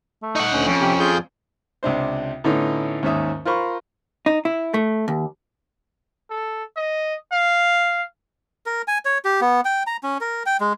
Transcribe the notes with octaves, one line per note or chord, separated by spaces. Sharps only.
A3
D#4 F#5 C#6
D2 C#4
F2 C#4
C3 G4
F4 G#4 G6
C#2 C3 D4 C5
A2 D3 B3 C#4 D#4
D#2 G#2 C#4 E5 D#6
F4 A#4 C5 B5 C#6
D#4
E4
A3
D#2
A4
D#5
F5
A#4
G#5
C#5
G4
B3
G5
A#5
C#4
A#4
G5
G#3